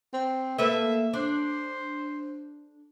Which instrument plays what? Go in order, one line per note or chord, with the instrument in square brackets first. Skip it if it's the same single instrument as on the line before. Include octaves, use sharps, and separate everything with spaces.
[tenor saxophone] C4
[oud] A#3 A4 B4 [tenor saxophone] E5
[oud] D4 [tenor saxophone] C5